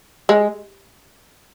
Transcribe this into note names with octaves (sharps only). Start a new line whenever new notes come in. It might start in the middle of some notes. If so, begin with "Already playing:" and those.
G#3